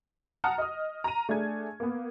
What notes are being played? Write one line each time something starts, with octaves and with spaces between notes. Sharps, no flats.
F#5 A5 A#5 D#6 F6
D#5 D#6
A#5 D#7
A3 D4 G#4 G#6
A#3 B3